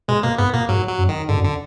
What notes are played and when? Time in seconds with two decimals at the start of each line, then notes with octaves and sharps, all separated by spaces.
0.08 B2 G#3
0.23 B2 A#3
0.38 G#2 B3
0.54 A#2 A#3
0.69 G#2 F#3
0.89 F#3
0.98 F#2
1.09 D#3
1.29 G#2 D3
1.37 F#2
1.44 D3